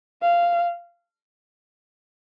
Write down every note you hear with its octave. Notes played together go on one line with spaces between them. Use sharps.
F5